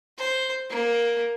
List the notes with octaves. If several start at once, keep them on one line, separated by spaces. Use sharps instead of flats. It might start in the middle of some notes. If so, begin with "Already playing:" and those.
C5
A#3